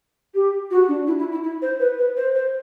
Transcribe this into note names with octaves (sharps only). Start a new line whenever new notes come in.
G4
F#4
D4
E4
E4
E4
E4
C5
B4
B4
C5
C5